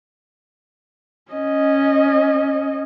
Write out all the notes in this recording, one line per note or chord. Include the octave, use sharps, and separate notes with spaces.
C#4 D#5